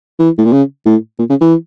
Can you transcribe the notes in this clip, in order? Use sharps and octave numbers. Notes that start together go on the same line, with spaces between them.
E3
A2
A#2
C#3
A2
A#2
C#3
E3